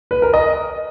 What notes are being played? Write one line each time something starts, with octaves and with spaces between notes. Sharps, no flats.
B4
A#4
D#5